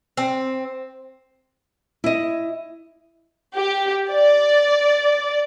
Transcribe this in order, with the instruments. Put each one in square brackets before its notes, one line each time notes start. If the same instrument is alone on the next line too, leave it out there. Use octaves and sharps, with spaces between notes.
[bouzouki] C4
[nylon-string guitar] E4 D#5
[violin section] G4
D5